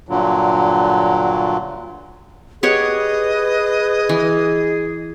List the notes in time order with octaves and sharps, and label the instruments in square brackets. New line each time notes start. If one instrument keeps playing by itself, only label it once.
[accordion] G2 A#2 D3 F#3
[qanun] G4 C#5 F#5 [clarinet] G#4 [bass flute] B4 [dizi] D#5
[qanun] E3